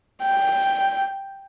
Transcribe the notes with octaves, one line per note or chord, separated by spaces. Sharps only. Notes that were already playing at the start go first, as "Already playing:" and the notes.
G5